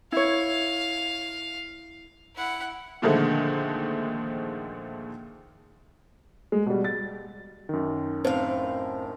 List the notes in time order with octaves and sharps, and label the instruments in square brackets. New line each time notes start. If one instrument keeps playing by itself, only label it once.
[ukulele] E4 C#5 [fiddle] F5
[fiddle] E4 F#5
[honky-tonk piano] A#2 D3 D#3 F3 G#3 A3
[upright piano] G#3
B2 G3
A6
[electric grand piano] F#2 D#3
[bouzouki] A2 F5 [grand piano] C4